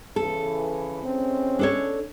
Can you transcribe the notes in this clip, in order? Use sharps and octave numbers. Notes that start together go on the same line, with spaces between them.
C#3 E3 A4
E3 G#3 C4 C#4
D4 A4 C#5